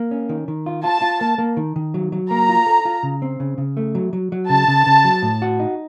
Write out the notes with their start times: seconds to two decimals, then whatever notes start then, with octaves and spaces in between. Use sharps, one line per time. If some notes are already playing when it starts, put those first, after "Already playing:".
Already playing: A#3
0.11 C#4
0.29 D#3
0.48 D#3
0.66 F4
0.84 F4 A5
1.02 F4
1.21 A#3
1.38 A#3
1.57 D#3
1.76 D#3
1.94 F#3
2.12 F#3
2.31 A#3 A#5
2.49 F4
2.66 A4
2.85 F4
3.03 C#3
3.22 C4
3.40 C#3
3.58 C#3
3.77 A3
3.95 F#3
4.13 F#3
4.32 F#3
4.50 C#3 A5
4.68 C#3
4.87 C#3
5.05 F#3
5.22 A2
5.42 F#4
5.60 D#4